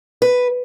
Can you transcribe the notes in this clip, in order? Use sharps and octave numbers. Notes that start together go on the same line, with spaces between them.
B4